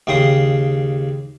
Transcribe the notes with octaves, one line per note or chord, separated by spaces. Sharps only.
D#2 C#3 G5 C6 D#6